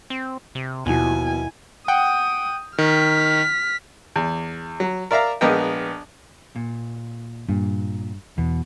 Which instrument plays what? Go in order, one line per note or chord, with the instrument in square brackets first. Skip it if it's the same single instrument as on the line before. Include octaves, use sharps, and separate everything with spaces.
[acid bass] C4
C3
[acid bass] D#2 [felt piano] B2 F3 [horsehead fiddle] E4 G#5
[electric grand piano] F#5 G5 G6 [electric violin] D#6
[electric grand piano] D#3 [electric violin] F6 B6
[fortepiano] E2
F#3
A#4 D5 E5 F5 A#5
A#1 G#3 B3 A#4 D#5 G5
[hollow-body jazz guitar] A#2
[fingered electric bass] G2 [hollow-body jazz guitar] A#2
[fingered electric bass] E2 [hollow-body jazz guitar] B2